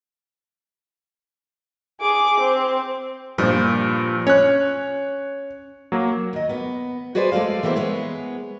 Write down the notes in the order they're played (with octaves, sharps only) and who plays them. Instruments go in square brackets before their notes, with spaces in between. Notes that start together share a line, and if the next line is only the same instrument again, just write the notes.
[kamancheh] G#4 D6
C4
[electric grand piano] G2 A#2 [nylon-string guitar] F3
[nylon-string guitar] C#4 [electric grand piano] C#5 F#6
[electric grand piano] F#3 A#3
[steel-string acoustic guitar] D#2 D#5
B3
F#4 G#4 B4 C5 D5
G#3 A3 D5 F5
E3 A#3 B3 E4 C5
G#3 B3 C#5